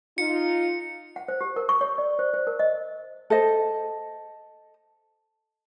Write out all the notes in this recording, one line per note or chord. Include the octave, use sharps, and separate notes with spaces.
D#4 F4 C#7
F#5
C5
G4
A#4
C#6
C#5
D5
C5
C5
A#4
D#5
A4 C5 D#5